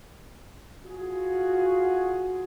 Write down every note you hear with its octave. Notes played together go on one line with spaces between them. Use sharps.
F4 F#4 G#4